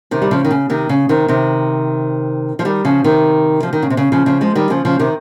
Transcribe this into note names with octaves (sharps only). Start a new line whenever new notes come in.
C3 D#3
G3
C#3 F3
D#3
C#3
C3 D#3
C#3
C3 D#3
C3 D#3
F3
D#3 G3
C#3 F3
C3 D#3
F3
D#3
C#3
C3
C#3
C#3 F3
C#3 F3
F3 G#3
D#3 G3
C#3 F3
C#3 F3
C3 D#3